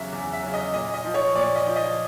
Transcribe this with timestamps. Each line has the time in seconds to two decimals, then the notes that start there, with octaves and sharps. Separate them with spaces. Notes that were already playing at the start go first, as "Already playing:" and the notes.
Already playing: E2 C#3 F#3 E5 F#5
0.12 E2
0.33 E5
0.43 C#3 F#3
0.54 D#5
0.73 A#2 D#5
0.94 D#5
1.04 F3
1.14 C#5
1.35 A#2 D5
1.56 D#5
1.66 F3
1.76 D#5